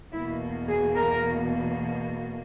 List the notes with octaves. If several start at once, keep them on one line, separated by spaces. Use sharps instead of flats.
E2 B2 A#3 E4
G#4
A#4